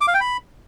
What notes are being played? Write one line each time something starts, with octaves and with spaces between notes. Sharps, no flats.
D6
F5
G5
B5